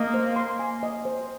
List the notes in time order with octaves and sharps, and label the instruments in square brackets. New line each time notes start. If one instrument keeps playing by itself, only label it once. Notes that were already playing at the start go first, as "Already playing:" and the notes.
Already playing: [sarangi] A#3 [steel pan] D#5
[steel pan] C5
C6
G#5
D#5
C5